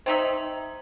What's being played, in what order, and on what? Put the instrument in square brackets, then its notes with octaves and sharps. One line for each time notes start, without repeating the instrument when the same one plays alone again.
[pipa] C4 D#4 E5 [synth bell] C5 A#5